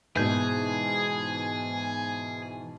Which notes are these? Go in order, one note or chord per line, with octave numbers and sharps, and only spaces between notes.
G#2 B2 E3 G#4 B4 G6